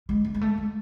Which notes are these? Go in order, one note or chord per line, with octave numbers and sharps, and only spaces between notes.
G#3
A3
G#3
A3
G#3